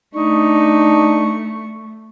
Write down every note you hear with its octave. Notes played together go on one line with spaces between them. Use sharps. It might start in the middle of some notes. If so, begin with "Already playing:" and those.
A3 D4 D#4 C#6